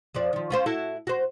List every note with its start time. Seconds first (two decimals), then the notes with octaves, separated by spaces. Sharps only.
0.15 F2 F3 D5
0.33 D#3 F3
0.50 C#4 F4 C5
0.66 E4 F#4 A4
1.07 F#4 C5